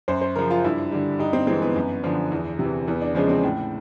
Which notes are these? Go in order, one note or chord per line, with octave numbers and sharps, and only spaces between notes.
F#2 C5
C5
C#3 F3 A#4
F4
G2 E4
D3 G3
G2 D#4
C4
E3 G#3 C4
B3
F#2
D3 F3
E2
C3 E3
E2 B3
D4
C#3 F3 G#3 C#4
C4
A2